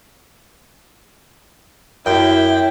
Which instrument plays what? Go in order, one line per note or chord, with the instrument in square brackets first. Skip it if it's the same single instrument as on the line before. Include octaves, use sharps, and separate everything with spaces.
[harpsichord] F#2 [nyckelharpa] E4 [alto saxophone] G5